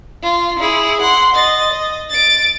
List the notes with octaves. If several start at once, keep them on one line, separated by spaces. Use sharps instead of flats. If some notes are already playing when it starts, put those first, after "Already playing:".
F4
E4 G#4
F#5 C6
D#5 A6
D#5
A6 D7